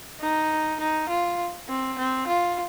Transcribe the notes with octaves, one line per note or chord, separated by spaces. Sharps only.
D#4
D#4
F4
C4
C4
F4